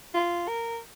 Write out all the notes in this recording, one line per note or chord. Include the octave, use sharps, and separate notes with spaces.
F4
A#4